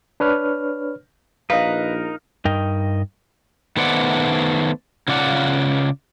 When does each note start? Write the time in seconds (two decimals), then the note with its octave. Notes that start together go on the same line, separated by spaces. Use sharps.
0.20 D4 B4 C#5 F6
1.50 A#1 D#4 A#4 B4 D#5 F5
2.45 G2 D#4 A#4 D#5 G5
3.77 D#3 A3 B3 C5 D5 F#5
5.08 C#3 F4 D5 F#5